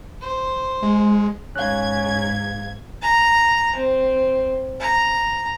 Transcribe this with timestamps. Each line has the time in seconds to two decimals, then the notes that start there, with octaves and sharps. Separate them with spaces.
0.21 C5
0.82 G#3
1.56 G#2 C#4 F5 F#6 G#6
3.02 A#5
3.76 C4
4.80 A#5